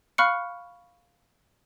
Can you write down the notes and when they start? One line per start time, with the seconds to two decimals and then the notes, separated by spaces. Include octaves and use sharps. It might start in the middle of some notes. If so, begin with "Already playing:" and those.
0.18 F5 B5 C#6 F6 F#6 C#7